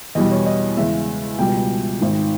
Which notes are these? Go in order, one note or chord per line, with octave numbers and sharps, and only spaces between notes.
E2 B2 G3 D#5
C#5
D#5
E2 C#3 G#3 E5
C#2 B2 G3 G5
G#1 G#2 D#3